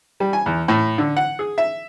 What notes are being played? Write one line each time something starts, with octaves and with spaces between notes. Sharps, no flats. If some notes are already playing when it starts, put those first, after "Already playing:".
G3
G#5
E2
A2
D3
F#5
G#4
E5